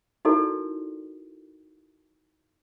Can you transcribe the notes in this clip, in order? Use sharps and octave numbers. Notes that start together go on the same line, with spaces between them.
D#4 E4 F#4 A4 A#4 D5